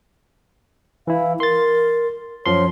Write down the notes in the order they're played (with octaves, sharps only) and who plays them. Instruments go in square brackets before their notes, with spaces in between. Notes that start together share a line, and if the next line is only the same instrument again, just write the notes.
[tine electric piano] E3 E4 [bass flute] F5
[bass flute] A#4 [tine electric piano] C6 A6
[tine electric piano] F#2 F3 C6 [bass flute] C#5